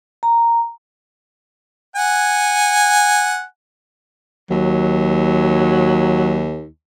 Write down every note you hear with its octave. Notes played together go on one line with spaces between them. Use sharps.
A#5
F#5 G#5
D#2 F#3